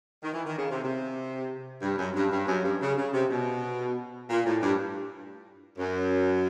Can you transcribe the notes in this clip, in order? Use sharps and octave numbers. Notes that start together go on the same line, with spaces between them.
D#3
E3
D#3
C#3
C3
C3
G2
F#2
G2
G2
F#2
G2
C#3
C#3
C3
B2
A#2
A2
G2
F#2